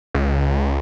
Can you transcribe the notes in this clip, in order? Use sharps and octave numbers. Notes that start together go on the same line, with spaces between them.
C#2